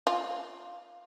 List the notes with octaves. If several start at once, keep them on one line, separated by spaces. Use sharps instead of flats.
F4